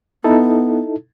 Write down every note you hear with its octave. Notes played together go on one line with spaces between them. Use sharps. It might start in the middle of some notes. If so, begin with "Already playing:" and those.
B3 D#4 E4 A4